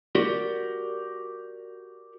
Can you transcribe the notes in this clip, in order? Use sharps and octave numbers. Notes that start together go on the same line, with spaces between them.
F#4 G4 A#4 D5